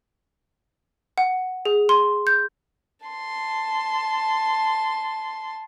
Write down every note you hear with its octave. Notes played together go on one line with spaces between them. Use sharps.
F#5
G#4
C6
G6
A5 C6